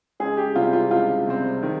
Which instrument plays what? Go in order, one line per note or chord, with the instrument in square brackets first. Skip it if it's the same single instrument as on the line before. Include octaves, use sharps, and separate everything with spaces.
[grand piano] C#2 [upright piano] G#4
[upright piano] G4
[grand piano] C3 G3 C4 [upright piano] F4
[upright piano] F4
[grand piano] C#2 [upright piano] F4
[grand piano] C3 G3 C4
D#3